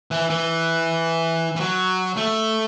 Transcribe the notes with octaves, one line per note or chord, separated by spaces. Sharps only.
E3
E3
E3
F#3
A3